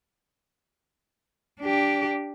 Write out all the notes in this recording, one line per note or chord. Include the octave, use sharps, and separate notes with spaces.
D4 G4